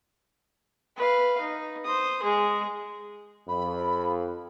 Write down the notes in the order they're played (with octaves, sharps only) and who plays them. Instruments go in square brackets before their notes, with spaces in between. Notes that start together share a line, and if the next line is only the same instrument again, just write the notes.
[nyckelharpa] B4 F5
D#4
C5 D#6
G#3 G#4
[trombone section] F2 [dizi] B5